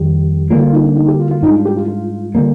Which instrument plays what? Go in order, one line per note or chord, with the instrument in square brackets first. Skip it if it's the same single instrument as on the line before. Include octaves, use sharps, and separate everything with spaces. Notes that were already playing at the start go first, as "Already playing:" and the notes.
Already playing: [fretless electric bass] F2 D#3 G3 [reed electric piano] G4
[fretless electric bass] D3 G3 A#3 [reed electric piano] F4
[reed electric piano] F4
D#4
D4
D#4
G4
F4
F4
[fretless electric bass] G#2 G3 D4 [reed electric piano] D#4
[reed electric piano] F4
G4
F4
F4
[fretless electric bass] D3 G3 A#3